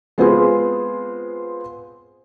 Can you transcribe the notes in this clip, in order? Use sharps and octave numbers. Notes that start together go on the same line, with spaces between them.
G#3 B3 C4 F4 G#4